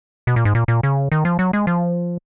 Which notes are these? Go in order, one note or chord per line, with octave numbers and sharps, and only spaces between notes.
B2
A#2
G#2
A#2
A#2
C#3
D#3
F3
F#3
G#3
F3